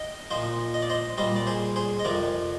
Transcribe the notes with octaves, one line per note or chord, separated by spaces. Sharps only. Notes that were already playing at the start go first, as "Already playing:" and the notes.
Already playing: D#5 G5
A#2 F3 C5 D#5
D#5
D5
C5 D#5
A#2 G3 C5 D#5
D5
G#4 C5
G#4 C5
D#5
F2 C3 F3 A#4 D5